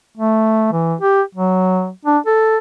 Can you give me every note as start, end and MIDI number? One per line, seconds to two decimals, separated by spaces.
0.17 0.71 57
0.72 0.95 52
1.01 1.22 67
1.35 1.90 54
2.05 2.18 62
2.26 2.58 69